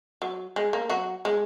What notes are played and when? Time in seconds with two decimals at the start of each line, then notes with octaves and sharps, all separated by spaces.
0.22 F#3
0.56 G#3
0.73 A#3
0.89 F#3 F#4
1.25 G#3